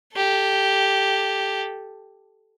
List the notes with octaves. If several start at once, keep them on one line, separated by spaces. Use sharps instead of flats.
G4 A4